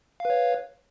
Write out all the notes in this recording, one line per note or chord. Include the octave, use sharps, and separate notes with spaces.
B4 C#5 F5